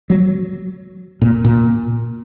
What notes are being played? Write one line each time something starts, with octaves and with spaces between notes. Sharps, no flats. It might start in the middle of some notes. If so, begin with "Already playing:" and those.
F#3
A#2
A#2